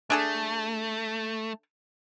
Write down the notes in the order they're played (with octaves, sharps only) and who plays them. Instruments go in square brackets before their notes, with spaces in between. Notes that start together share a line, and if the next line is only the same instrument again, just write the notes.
[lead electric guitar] A3 [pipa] D4 G#4 A4